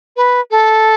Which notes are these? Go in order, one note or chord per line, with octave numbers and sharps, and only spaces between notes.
B4
A4